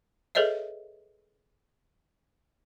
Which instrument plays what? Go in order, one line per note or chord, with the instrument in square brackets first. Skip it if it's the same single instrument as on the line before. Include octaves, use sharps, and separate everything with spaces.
[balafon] G#4 A4 B4 C#5 D#5 E5